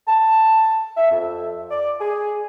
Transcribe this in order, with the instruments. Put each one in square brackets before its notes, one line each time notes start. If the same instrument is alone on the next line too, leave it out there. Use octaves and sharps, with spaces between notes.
[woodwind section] A5
E5
F2
D5
G#4